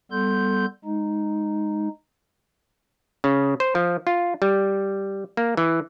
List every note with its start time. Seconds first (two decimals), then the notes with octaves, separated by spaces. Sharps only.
0.12 G3 B3 A4 C6 G6
0.85 G#3 D#4
3.24 C#3
3.60 C5
3.75 F3
4.07 F4
4.42 G3
5.37 A#3
5.57 E3